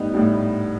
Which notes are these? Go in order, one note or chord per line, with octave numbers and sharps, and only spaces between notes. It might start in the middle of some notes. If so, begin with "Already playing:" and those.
Already playing: A2 G3 B3 D#4
A2 G3